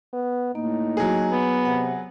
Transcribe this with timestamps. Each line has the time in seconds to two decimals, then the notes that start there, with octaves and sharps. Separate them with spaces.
0.13 B3
0.55 A2 A#3 D#4
0.97 F#3 G#4
1.29 B3
1.65 C3 F#5